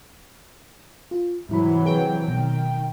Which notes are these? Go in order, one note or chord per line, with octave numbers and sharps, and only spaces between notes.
F4
G#2 C3 E3 F#3 E4 B5
G#4 B4 C#5 G5
B2 D#3